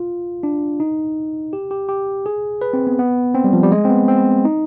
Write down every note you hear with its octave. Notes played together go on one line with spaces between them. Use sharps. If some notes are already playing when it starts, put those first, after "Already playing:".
Already playing: F4
D4
D#4
G4
G4
G4
G#4
B4
C4
B3
B3
C4
G3
F3
G3
G#3
C4
B3
C4
D#4